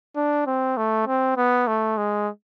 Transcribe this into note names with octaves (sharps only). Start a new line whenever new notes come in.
D4
C4
A3
C4
B3
A3
G#3